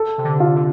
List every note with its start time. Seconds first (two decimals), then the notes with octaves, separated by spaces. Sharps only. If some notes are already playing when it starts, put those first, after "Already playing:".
Already playing: A4
0.18 C3
0.24 D3
0.40 F4
0.56 D3